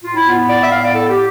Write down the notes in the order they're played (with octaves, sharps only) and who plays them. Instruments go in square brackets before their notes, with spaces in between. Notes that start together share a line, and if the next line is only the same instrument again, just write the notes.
[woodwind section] A2 F4
E4
B3 F4
E4
A2 D5
E5
B3 F5
D5
A2 A4
G4